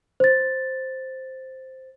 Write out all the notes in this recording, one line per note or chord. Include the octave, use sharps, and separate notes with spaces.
C5 A6